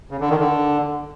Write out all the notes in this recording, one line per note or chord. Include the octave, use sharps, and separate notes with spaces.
C#3
D3
D#3
D3